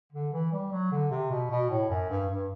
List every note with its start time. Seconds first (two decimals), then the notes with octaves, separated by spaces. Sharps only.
0.12 D3
0.33 E3
0.52 G3
0.72 F#3
0.92 D3
1.11 C3
1.30 B2
1.50 B2
1.70 A2
1.90 F#2
2.10 G2
2.29 G2